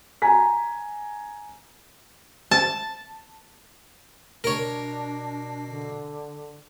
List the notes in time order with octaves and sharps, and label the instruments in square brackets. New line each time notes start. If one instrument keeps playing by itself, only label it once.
[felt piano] G#5 A#5 B6
[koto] A5
[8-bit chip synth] B2 [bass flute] D4 [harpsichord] A#4 C#5
[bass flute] D3